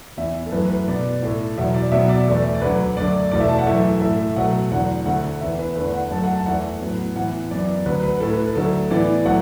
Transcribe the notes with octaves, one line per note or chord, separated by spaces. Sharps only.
E2 E3 B3 E5
A4
F#2 E3 A3 B4
B4
B2 B3 D5
A2 A3
E2 B2 F#3 E5
D5
B2 F#3 B3 E5
D5
E2 E3 A3
D5
D2 D3 F#3 B4
F#2 D3 A3 D5
E2 B2 A3 D5
E5
A5
F#5
F#2 E3 A3 E5
A2 A3 E5
B2 F#3 A3 F#5
E2 D3 F#3 F#5
D2 D3 A3 F#5
E2 E3 B3 E5
B4
E2 D3 A3 B4
F#5
F#2 F#3 A3 A5
F#5
A5
E2 E3 A3 F#5
A2 F#3 B3
A2 E3 B3 F#5
F#2 E3 B3 D5
D2 D3 F#3 B4
B4
A2 A3 A4
B4
A4
D2 D3 F#3 A3 A4
A2 E3 B3 D5
A2 F#3 A3 F#5